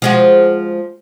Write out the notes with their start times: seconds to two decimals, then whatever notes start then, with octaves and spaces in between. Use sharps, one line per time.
0.02 F3 G#3 F#4